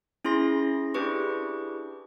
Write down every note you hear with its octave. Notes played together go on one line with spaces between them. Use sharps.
C#4 E4 G#4 C6 A#6
D4 E4 G4 G#4 B4 C#6